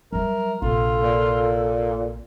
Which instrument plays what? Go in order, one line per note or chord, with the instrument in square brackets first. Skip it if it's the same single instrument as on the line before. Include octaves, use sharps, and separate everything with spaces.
[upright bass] F#3 G3 [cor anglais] A#4 [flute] E5
[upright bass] A#1 C3 [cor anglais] F4 [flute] A4
[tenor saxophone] A#2